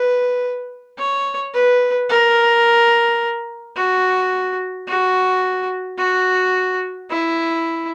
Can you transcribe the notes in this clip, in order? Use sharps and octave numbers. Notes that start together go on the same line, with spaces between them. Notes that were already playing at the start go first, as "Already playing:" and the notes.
Already playing: B4
C#5
B4
A#4
F#4
F#4
F#4
E4